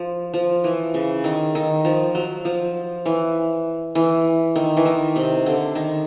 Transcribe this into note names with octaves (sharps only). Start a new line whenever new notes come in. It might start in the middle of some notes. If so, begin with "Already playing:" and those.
Already playing: F3
F3
E3
C#3
D#3
D#3
F3
F#3
F3
E3
E3
D#3
E3
D#3
C3
D3
D#3